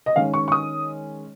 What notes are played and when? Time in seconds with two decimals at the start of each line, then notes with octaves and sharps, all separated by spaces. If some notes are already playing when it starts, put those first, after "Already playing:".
0.06 D#5
0.16 D#3 G#3 C#4 F5
0.34 C#6
0.48 C#6
0.52 D#6